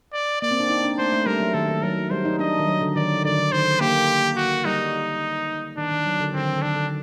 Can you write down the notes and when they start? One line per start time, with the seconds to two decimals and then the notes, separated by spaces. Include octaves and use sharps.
0.13 D5
0.42 A#3 D5
0.51 C4
0.60 D4
0.70 D#4
0.84 D4
0.98 A3 C5
1.12 A3
1.26 G3 A#4
1.40 F#3
1.54 D#3 A4
1.68 D#3
1.83 F#3 A#4
2.10 G3 C5
2.25 D#4
2.39 D4 D#5
2.59 D#3
2.67 F#3
2.81 D3
2.96 D#3 D5
3.24 D3 D5
3.31 D#3
3.38 D3
3.52 D#3 C5
3.66 D#3
3.80 A#3 G4
4.36 F#4
4.65 G3 D#4
5.78 D#3 D4
5.92 D#3
6.06 F#3
6.20 D3
6.34 D3 C4
6.45 D#3
6.54 D3
6.62 D#3 D4
6.75 D3